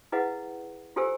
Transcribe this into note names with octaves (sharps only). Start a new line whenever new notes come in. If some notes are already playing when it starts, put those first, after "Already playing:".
E4 G#4 B4 D#5 F5 F#5
F4 G4 A4 C5 G#5 E6